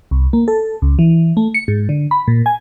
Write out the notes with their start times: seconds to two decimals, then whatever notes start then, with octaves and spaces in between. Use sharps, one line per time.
0.11 C2
0.33 A#3
0.48 A4
0.82 C#2
0.99 E3
1.37 A3
1.54 C#7
1.68 G#2
1.89 D3
2.11 B5
2.28 A#2
2.46 G#5